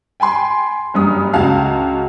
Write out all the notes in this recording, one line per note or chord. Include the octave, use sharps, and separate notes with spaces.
G5 G#5 B5 C6
F#1 G2 G3 D#6
C#2 C#3 F#4 F5 A5 F6